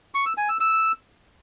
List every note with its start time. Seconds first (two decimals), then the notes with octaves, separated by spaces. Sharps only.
0.14 C#6
0.26 E6
0.37 G#5
0.49 E6
0.60 E6